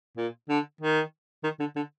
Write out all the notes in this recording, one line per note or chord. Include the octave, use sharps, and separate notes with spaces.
A#2
D3
D#3
D#3
D3
D3